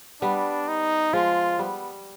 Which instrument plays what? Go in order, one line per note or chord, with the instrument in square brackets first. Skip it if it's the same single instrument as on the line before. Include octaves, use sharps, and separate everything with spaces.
[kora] G3 B3 [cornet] D4
[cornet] D#4
[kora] F3 G#3 [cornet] F4
[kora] G3 B3